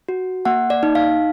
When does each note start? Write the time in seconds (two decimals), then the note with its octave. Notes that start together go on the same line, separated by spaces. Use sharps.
0.09 F#4
0.45 A#3 F#5
0.70 D5
0.83 D#4
0.95 F5